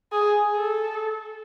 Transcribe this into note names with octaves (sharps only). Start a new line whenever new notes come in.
G#4
A4